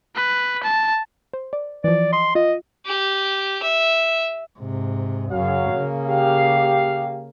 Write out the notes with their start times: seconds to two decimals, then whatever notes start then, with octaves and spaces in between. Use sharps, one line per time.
0.16 B4
0.64 A5
1.33 C5
1.53 D5
1.84 E3 F3 D5
2.13 D#5 C6
2.35 F4 D#5
2.86 G4
3.63 E5
4.59 G#2 C3
5.32 F#2 C#3 F#3 F5
5.72 C#3 A#3
6.07 G4 F5